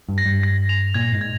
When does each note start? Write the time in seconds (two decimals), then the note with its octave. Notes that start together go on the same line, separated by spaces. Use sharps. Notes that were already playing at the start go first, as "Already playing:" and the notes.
0.09 G2
0.18 A#6
0.26 G2
0.43 A#6
0.69 F7
0.94 A#2 G#6
1.12 G#2
1.21 G#6